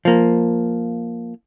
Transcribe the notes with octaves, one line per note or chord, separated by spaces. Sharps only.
F3 A#3